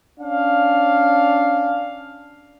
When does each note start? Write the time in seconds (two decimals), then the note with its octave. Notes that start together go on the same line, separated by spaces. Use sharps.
0.19 C#4 D4 F5